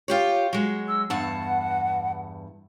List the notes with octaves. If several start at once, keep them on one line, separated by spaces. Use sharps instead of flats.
F4 G4 C#5
F#3 G#3
E6
E2 G2 F#5 A5